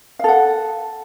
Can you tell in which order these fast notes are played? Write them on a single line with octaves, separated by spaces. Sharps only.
F5 A4 F#5